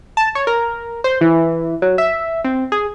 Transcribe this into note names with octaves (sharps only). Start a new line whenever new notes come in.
A5
C#5
A#4
C5
E3
F#3
E5
C4
G#4